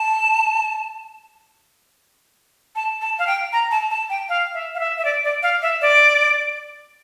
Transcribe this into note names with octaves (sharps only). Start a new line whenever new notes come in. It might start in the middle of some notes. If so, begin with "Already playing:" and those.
Already playing: A5
A5
A5
F5
G5
A#5
A5
A5
G5
F5
E5
F5
E5
E5
D5
D5
F5
E5
D5